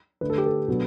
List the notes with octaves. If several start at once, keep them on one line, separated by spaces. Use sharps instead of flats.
D3 A3 D4 B4
A4
G4
A4
B2 F#3 B3 D4